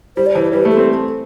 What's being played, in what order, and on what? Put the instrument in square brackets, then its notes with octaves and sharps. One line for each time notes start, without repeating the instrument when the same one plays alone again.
[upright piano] G3 [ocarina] C5
[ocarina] D5
[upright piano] E3 [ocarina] C5
[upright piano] G3 [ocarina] B4
[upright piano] A3
[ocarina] A4
[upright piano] C4